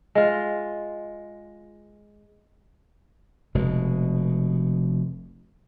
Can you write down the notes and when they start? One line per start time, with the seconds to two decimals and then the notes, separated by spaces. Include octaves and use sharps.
0.15 G#3 F4
3.55 F1 B2 G#3